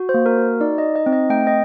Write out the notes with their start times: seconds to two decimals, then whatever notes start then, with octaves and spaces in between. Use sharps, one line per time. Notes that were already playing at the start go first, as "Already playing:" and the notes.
Already playing: F#4
0.09 C5
0.14 A#3
0.26 A#4
0.38 F#4
0.61 D#4 D5
0.78 D#5
0.83 D#4
0.96 D#5
1.06 C4
1.13 D#5
1.30 A3 G5
1.47 D#5